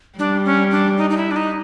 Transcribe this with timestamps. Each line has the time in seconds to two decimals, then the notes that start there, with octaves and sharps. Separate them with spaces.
0.19 G3 D4
0.45 C#4
0.71 D4
0.97 D#4
1.10 D#4
1.17 E4
1.31 D4
1.36 D#4